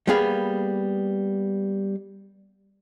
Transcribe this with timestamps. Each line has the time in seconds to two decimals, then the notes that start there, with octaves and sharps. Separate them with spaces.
0.07 G3 A#3 B3 G#4 F5